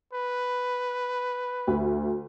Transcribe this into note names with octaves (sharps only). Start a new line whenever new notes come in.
B4
D2